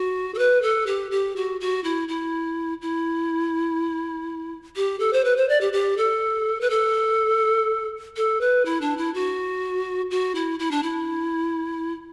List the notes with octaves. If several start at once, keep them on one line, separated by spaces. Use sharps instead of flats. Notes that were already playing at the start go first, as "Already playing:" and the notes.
Already playing: F#4
A4
B4
A4
G4
G4
F#4
F#4
E4
E4
E4
G4
A4
C5
B4
C5
D5
G4
G4
A4
B4
A4
A4
B4
E4
D4
E4
F#4
F#4
E4
E4
D4
E4